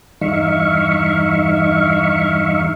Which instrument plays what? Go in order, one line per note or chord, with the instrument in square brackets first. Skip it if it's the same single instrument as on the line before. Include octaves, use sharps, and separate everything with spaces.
[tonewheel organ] E2 G2 D#4 E5 F5 C#6